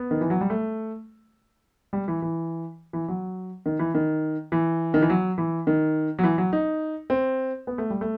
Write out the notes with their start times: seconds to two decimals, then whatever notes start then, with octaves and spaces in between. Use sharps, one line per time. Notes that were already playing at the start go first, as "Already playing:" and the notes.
Already playing: B3
0.11 D#3
0.21 E3
0.30 F#3
0.41 G3
0.50 A3
1.93 G3
2.08 E3
2.22 E3
2.93 E3
3.08 F#3
3.66 D#3
3.79 E3
3.94 D#3
4.52 E3
4.94 D#3
5.02 E3
5.10 F#3
5.38 E3
5.67 D#3
6.19 F#3
6.23 E3
6.38 F#3
6.53 D#4
7.10 C4
7.67 B3
7.78 A3
7.90 G3
8.01 A3